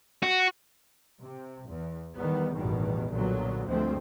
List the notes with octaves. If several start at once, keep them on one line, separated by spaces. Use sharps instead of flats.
F#4
C3
E2
E2 D#3 G3 B3
A1 E2 G2 B2 D#3
B1 G2 A#2 D3 F#3 B3
D2 G2 F3 G#3 A3 C4